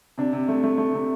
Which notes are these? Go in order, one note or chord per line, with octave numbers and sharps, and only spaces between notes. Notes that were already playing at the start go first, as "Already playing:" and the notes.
C3 D4
C3
A3
A3
A3
C3